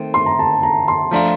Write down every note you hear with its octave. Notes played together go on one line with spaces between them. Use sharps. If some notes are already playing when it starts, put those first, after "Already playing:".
Already playing: D#3 A3 C4
C6
A#5
A5
A#5
C6
F3 A3 D4 F4 A#5